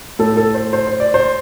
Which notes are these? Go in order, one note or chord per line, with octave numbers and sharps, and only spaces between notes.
A2 A4
A4
C5
C5
C5
D5
C5